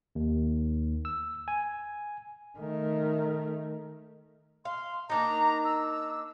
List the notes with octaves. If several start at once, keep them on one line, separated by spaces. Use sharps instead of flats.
D#2
E6
G#5
D#3 A3
F5 C6
A#3 D4 D#4 A#5
E6